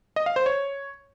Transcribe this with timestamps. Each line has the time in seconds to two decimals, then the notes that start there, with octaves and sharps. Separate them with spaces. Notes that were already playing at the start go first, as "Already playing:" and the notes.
0.16 D#5
0.26 F5
0.36 C5
0.46 C#5